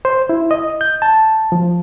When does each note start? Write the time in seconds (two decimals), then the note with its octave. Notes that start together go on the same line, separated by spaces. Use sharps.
0.05 C5
0.29 E4
0.51 D#5
0.81 G6
1.02 A5
1.52 F3